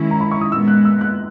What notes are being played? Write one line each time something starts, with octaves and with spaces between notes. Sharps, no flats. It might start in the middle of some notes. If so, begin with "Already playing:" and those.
Already playing: D#3 G#3 C#4 E4
A#5
B5
C#6
D#6
A#2 G#3 B3 E6
F#6
E6
F#6